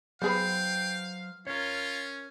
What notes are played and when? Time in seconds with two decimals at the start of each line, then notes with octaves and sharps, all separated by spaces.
0.22 F#3 B3 G#4 B4 C5 F5 G5
1.47 C#4 F4 A#4 C#5